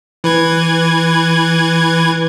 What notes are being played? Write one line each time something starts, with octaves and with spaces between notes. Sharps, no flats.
E3 B4 G#6